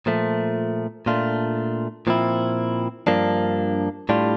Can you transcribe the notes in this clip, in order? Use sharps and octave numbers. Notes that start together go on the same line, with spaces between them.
A#2 F3 A3
A#2 A3 D4 F4
A#2 F3 C4 E4
G2 F3 A#3 D4
A2 G3 D4 F4